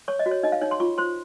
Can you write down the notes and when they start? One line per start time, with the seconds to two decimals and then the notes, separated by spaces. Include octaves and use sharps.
0.08 C#5 C#6
0.19 D#5
0.26 F#4
0.31 C#5
0.43 D#4 D#5
0.52 F5
0.61 D#4 C#5
0.71 C6
0.80 F4 C#6
0.98 C5 C6